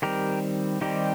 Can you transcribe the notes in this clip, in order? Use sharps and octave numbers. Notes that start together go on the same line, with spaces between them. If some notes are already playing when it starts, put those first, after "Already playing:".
D#3 G3 C4 G4 A#4
D#3 G3 C4 D#4 G4